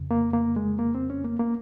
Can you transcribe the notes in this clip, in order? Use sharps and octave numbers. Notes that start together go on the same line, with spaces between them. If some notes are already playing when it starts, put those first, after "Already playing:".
Already playing: F2 C#3
A#3
A#3
G#3
A#3
C4
C#4
A#3
A#3